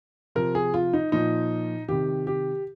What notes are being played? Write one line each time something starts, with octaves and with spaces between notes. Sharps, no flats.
C3 F3 A#4
G#4
F4
D#4
A#2 F3 D#4
C3 D#3 G4
G4